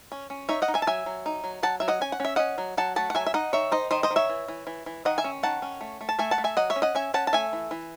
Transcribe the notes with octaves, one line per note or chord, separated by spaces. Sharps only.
C#4
C#4
D#4 C#5 E5
D#5 F#5
D#4
E5 G#5
A5
F#3 E5 G#5
F#3
D#4
F#3
F#3 F#5 A5
F#3 E5
D#5 F#5
C#4 G#5
F#5
C#4 E5
C#4 D#5 F#5
F#3
F#3 F#5 A5
A3 F#5 A5
F#5
F#3 E5 G#5
E5
D#4 D#5 F#5
D#3 C#5 E5
D#4 C5 D#5
D#3 C5 D#5
C5 D#5
D#3
C#5 E5
E3
E3
E3
E3
D#3 D#5 F#5
E5 G#5
C#4
D#3 F#5 A5
C#4
A3
A3
A5
A3 E5 G#5
F#5 A5
A3
E5 G#5
F#3 D#5 F#5
C#5 E5
C#4
D#5 F#5
C#4 E5 G#5
C#4 F#5 A5
A5
A3 E5 G#5
E3
E3